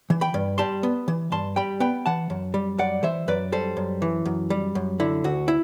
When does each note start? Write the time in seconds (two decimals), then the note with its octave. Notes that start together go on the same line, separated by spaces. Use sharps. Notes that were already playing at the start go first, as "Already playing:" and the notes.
0.10 E3
0.21 G5 B5
0.34 G2
0.58 G3 A5 C6
0.83 B3
1.08 E3
1.32 G2 A5 C6
1.56 G3 G5 B5
1.80 B3 G5 B5
2.06 E3 F#5 A5
2.30 F#2
2.54 G3
2.79 F#2 D5 F#5
3.03 E3 C5 E5
3.28 F#2 B4 D5
3.52 G3 A4 C5
3.77 F#2
4.02 E3
4.25 F#2
4.50 G3
4.75 F#2
5.00 D3 E4
5.24 D2 F#4
5.48 E4